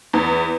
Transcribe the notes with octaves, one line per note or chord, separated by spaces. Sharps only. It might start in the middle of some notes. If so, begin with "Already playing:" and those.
E2